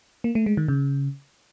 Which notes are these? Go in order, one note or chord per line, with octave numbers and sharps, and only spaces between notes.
A#3
A3
G#3
D#3
C#3